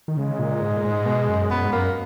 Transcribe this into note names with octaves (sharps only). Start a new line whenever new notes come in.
D#3
C#3 G#3
A#2
G#2
A#2
G#2
B2
F#2
F#2 B3
G#2
F#2 A#3